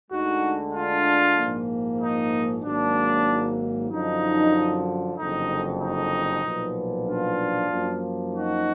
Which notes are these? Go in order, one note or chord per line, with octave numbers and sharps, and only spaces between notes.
D2 D3 G#3 D#4 F#4
D4 F4
A#1 G#2 F3 A#3
D#4
G#1 G#2 F#3 A#3 D4
F#2 D3 F3 D#4
F#1 F2 D3 D#4
D#4
B1 A#2 F3 B3
D4 F4
F#2 F3 A#3
D#4 F#4